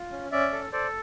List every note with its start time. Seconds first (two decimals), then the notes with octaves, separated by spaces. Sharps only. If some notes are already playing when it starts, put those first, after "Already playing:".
Already playing: F4
0.11 C#4
0.32 C#4 D5 E5
0.53 A4
0.73 A4 C5 D5